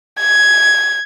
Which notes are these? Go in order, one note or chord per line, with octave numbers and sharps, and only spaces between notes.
G#6